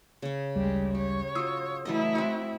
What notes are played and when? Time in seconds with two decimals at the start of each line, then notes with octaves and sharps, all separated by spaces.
0.22 C#3 C#4
0.56 A1 D2 G3 G#3 G4
0.95 G4 C#5
1.35 F4 F#4 D#6 E6
1.85 E3 F#3 A3 E4 D#5
2.15 C4 F#4